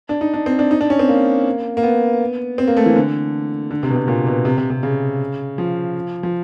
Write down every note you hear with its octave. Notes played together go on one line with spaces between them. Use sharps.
D4
D#4
D4
C4
D4
D#4
D4
C#4
C4
A#3
A#3
B3
C4
A#3
A3
E3
D3
D3
C3
B2
C3
A#2
B2
C3
C3
C3
C#3
F3
F3